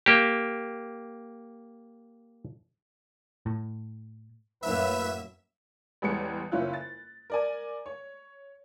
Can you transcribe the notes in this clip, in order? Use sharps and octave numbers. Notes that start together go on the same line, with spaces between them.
A#3 G4
A2
F#2 A2 A#3 B4 E5 E7
A1 E2 G3 G#3 C#5 C#7
F#1 C#4 E4 F4 F#6
A6
A#4 D5 G#5
C#5